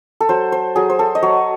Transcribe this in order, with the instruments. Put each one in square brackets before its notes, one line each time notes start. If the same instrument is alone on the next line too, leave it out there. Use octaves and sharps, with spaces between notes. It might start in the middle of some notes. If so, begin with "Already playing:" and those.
[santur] A4
F#3 C5
C5
F#3 G#4
C5
A4
D#5
F#3 C#5